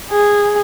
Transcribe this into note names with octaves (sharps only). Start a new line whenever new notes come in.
G#4